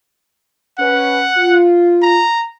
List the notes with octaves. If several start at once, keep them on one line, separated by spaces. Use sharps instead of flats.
C#4 B4 F#5
F4
A#5